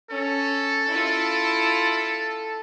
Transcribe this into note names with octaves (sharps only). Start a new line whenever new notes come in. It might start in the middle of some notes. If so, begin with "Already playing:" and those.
C#4 A4
E4 F4